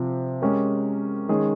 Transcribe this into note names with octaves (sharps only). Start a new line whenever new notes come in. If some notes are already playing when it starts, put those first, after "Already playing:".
Already playing: C3 F3 C4
G#3 C#4 G4 A#4
D#3 G#3 C#4 G#4